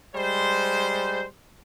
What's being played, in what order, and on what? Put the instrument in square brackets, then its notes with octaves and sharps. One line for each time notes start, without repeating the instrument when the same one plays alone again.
[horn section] G3 G#3 C5